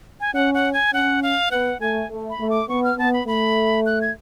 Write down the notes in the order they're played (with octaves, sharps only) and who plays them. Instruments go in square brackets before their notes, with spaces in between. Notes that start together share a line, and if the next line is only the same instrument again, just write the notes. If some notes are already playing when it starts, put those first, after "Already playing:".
[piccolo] G#5
[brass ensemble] C#4 [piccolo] F#5
[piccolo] F#5
G#5
[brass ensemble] C#4 [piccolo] F#5
[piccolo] F5
[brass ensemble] B3 [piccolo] F#5
[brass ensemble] A3 [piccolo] G#5
[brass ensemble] A3
[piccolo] B5
[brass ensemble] A3
[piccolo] D6
[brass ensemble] B3 [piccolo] C#6
[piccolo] F6
[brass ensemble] B3 [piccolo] A5
[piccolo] B5
[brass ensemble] A3 [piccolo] B5
[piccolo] F#6
G#6